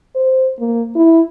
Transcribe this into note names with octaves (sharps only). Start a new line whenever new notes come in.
C5
A#3
E4